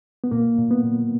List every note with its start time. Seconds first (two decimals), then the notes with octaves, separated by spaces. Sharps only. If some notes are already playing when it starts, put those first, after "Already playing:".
0.24 B3
0.31 A#2 A#3
0.58 A#2
0.71 B3
0.84 A#2